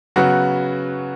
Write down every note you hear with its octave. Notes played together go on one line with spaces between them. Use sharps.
C#3 F#3 B3 F#4